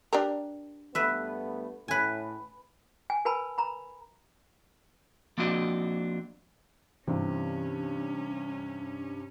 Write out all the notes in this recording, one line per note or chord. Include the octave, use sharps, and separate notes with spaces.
D4 G4 A#4
G2 A3 B3 B4 E5
A2 B4 G#5
G#5
A#4 B4 G#5 A5 B5
A#5 B5
F3 A#3 C4 D4 F#4 D#5
G2 C3 E3 C#4